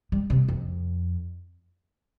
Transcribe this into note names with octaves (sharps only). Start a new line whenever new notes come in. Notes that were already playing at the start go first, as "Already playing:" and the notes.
G3
C3
F2